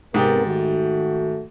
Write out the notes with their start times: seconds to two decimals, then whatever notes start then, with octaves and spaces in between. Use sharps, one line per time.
0.14 G#2 C3 B3 G4 A#4 G5
0.45 D#3 A3 F#4